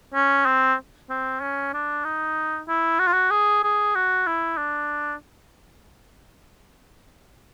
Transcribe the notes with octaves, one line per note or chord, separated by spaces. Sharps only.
C#4
C4
C4
C#4
D4
D#4
E4
F#4
F4
F#4
G#4
G#4
F#4
E4
D4